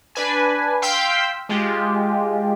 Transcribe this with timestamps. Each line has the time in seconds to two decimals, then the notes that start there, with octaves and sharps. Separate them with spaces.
0.15 D4 B4 G#5
0.82 F5 G5 C6 E6 G6 B6
1.49 G#3 F4 G4